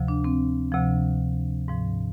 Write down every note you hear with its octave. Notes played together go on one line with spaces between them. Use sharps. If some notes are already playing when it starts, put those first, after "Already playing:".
Already playing: D2 C3 F3
D4
C4
D2 C3 F3
G#2 F3